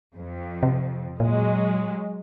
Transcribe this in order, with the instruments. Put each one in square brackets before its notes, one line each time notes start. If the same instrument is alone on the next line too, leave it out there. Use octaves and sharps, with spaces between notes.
[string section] F2
[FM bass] C3
[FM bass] A#2 [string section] F#3 G#3